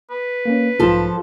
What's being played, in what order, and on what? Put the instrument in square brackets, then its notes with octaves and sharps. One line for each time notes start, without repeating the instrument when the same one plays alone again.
[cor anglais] B4
[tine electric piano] A#3 C#4
[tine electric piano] B1 G#2 [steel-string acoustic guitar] F3 A4 [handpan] F4